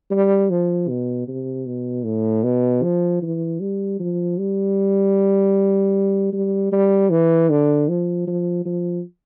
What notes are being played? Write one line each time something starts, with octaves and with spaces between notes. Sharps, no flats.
G3
F3
B2
C3
B2
A2
B2
F3
E3
G3
F3
G3
G3
G3
E3
D3
F3
F3
F3